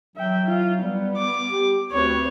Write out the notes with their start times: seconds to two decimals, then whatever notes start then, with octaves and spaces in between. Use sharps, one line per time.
0.16 F#3 E5 G5
0.47 F4
0.83 G3 B3
1.16 D6
1.52 G4
1.92 D2 C4 B4 C#5